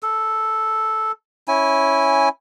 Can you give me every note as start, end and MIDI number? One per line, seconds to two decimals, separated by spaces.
0.03 1.12 69
1.48 2.29 61
1.48 2.29 64
1.48 2.29 80